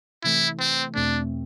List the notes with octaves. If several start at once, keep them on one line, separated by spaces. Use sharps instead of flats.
C3 E3 A3 E4
C4
E2 B2 A3 C4 D4